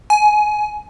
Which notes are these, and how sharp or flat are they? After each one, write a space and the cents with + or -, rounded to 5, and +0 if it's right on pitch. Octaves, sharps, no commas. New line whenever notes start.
G#5 +20